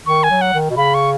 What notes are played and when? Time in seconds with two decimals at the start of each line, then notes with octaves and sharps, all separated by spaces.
0.06 D#3 C#6
0.23 G#5
0.30 F#3
0.41 F#5
0.54 D#3
0.70 B2
0.77 C#3 B5
0.94 C#6